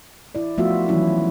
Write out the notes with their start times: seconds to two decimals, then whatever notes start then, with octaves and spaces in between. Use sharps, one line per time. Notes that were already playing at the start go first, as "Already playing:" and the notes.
0.35 E4 D5
0.58 F3 A3 B3 F4 F#4 E5
0.87 D#3 E3 F#3 C#4 E4 F4